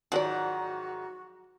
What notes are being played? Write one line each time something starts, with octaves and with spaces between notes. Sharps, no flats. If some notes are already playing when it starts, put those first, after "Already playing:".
G#2 D#3 F3 F#3 F#4 D5 F#5